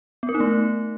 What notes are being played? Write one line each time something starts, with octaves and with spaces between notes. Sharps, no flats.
B3
A#4
D#4
A3